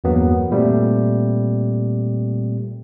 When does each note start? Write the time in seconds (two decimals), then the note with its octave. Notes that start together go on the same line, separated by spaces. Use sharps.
0.04 E2 G2 F#3 A#3 B3
0.51 A#2 G3 A3 C4